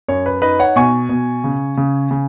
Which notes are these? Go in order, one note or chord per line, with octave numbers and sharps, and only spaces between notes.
F#2 C#5
B4
D#4 B4 D#5
C#5 F#5
B2 G#5 C#6
B2
C#3
C#3
C#3